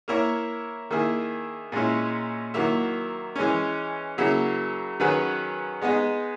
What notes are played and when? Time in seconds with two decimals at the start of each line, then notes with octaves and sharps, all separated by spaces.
0.08 A#3 E4 A#4 C#5
0.90 D#3 A#3 E4 G#4
1.72 A#2 G#3 C#4 E4
2.54 D#3 F#3 A#3 E4
3.35 E3 G#3 C#4
4.18 C#3 F#3 A#3 E4
5.00 D#3 F#3 C#4 G#4 B4
5.81 G#3 B3 D#4 G#4